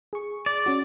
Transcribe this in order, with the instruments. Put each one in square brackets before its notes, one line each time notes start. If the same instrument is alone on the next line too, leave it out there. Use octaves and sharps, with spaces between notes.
[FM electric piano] G#4 C#6
[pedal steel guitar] D5
[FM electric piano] C#4 F#4